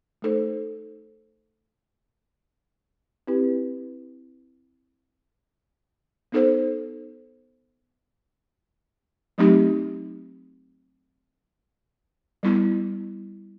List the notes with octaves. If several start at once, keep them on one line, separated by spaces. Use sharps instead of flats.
A3 D#4 A4 C5
C4 E4 G4 B4
B3 D#4 A4 C5
F#3 A3 C4 D#4 G4
G3 B3 E4